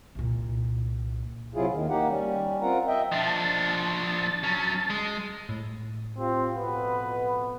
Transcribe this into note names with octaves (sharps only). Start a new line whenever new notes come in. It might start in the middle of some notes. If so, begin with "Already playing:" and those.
C2 A#2
C3 F#3 E4 F4 G#4
D#2 D#3
A#3 D#4 G4 F#5
G3 C#4
C4 F4 A#4 F#5 A#5
D#5 E5 G5
F3 D4 A5 A6
F#3 C#4
G#3
A2
C4 F4 G4
F2 B2 B3 B4